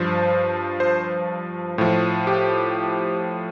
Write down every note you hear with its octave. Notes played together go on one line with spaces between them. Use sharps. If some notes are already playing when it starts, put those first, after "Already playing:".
Already playing: G2 F3 C5
C5
A2 F3
G4